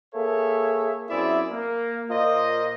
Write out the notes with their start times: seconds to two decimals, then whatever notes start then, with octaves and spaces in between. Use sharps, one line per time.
0.14 A#3 G#4 A4 C#5 E5
1.09 F#2 C4 E4 G#4 D5 E5
1.50 A#3
2.10 A#2 A#3 F4 C5 D#5